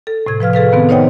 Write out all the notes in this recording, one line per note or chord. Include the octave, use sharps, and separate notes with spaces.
A4
A2 C3 G#6
F3 B4 F5 F6
G#4 A4 B4 F5
D#3 B3 C4
D#4 C5 C#5 D#5 F#5 G5